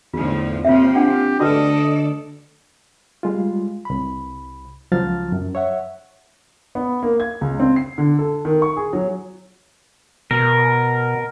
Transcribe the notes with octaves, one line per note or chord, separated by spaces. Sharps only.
E2 A2 D3 F3 D#4 F4
C3 F3 A#3 C4 F4 C#5 E5
D4 G4 F#5 G5
D2 D3 D4 F#4 A4 B4 D5 D#5
G3 G#3 F4
C2 B5
C#2 F3 F#3 F6 A6
F#2
C#5 E5 F#5
B3
A#3
G#6
C#2
C4
C7
D3
A4
D#3
C#6
G#4
F#3
B2 A#4